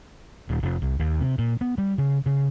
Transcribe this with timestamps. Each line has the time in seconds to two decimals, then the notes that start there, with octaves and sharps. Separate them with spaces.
0.49 D#1
0.63 F1
0.82 C2
0.99 D#2
1.20 C3
1.38 A#2
1.61 B3
1.78 G3
1.98 C#3
2.26 C#3